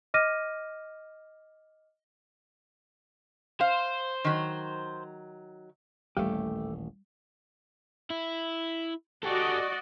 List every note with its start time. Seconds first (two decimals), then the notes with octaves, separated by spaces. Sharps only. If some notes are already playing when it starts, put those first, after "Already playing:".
0.14 D#5 D6 F6 A#6 D#7
3.61 C5 F5
4.24 D#3 F#3
6.17 D#1 A1 G3 A3 G4
8.10 E4
9.23 F#4 G4 A4 D5 D#5